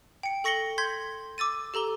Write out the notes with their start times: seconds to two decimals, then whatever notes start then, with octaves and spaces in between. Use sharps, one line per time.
0.23 G5 C#7
0.44 A4 C#6 A#6 C#7 F#7 G7
0.78 C6 G6 G#6 B6
1.38 D6 E6 A6 D#7
1.74 G4 A4 A#5 G7